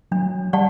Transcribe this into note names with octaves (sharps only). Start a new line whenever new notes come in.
F#3 D4
G3 G4 D5 F#5 A5